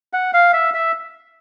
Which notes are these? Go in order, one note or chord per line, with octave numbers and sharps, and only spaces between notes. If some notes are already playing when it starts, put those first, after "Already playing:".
F#5
F5
E5
E5